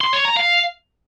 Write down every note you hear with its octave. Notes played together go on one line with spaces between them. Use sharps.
C6
C#5
A#5
F5